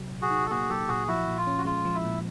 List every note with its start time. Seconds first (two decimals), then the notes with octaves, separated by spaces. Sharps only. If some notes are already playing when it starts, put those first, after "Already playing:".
Already playing: C3 F#3
0.12 A#2
0.22 F#4 G#4
0.31 D#4
0.46 A4
0.50 A#3 F#4 G#4
0.69 F#3 G4 A4
0.88 A#2 F#4 G#4
1.07 F3 E4 F#4
1.27 A#2
1.37 F4
1.47 C#4
1.58 F#4
1.65 G#3 F4
1.85 F3
1.94 E4
2.05 A#2